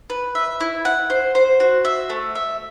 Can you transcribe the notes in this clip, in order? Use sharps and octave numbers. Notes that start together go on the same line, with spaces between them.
B4
E5
E4
F#5
C5
C5
F#4
E5
A3
E5